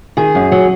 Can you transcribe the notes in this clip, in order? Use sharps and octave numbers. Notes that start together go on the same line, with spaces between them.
D#3 G#4
F#2
F#3